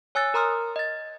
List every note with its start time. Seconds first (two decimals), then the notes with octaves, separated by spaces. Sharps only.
0.15 C#5 G#5 E6 F#6 A6
0.34 A#4 A#5 C6 D#6 F6
0.76 D#5 A6